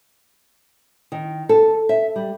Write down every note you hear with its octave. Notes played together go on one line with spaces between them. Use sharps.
D#3
A4
E5
G3